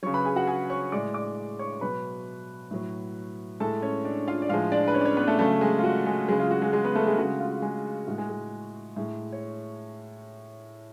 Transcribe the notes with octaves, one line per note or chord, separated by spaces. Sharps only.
C#3 F#3 C#5 C#6
B4 B5
G#4 G#5
F#4 F#5
G#4 G#5
C#5 C#6
A2 G#3 D5 D6
D5 D6
C#5 C#6
B2 F#3 B4 B5
A2 F#3
A2 G#3 A4 A5
C#4 C#5
D4 D5
F4 F5
D5
A2 F3 G#3 F4 F5
D4 D5
B4
C#4 C#5
D5
C#4 C#5
B3 B4
A3 A4
C#3 F#3 A3 A4
G#3 G#4
F4
F#4
G#3 G#4
C#3 F#3 G#3 G#4
F4
F#4
G#3 G#4
G#3 G#4
B3 B4
A3 A4
G#3 G#4
C#3 G#3 F#4
F4
G#3 G#4
A2 G#3 F#4
G#3 G#4
G#3 G#4
A2 G#3
C#5